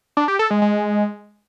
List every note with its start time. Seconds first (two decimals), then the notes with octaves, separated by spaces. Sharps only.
0.17 D4
0.28 G4
0.39 A4
0.51 G#3
0.62 G#3